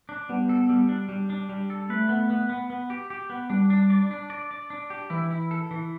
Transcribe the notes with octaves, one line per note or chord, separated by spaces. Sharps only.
D4
G3 B3
A4
G3
D4
G3
D4
G3
A4
A3 B4
B3
B3
B3
B3
G4
G4
B3
G3 D4
D4
D5
D4
D5
D5
D4
G4
E3 E4
E4
A4
E3